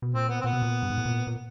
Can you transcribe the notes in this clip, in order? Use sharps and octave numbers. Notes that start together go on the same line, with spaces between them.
B2
A#2 C4
B3
C4
A#2 B3
B2
A#2
G2
G#2
A2
A#2
A#2